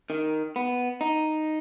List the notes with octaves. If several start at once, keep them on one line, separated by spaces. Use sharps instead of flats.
D#3
B3
D#4